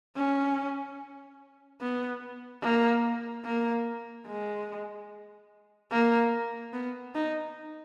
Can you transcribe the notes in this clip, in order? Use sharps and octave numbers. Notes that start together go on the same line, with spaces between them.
C#4
B3
A#3
A#3
G#3
A#3
B3
D#4